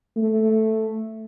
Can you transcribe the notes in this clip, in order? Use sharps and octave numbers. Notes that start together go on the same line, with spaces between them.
A3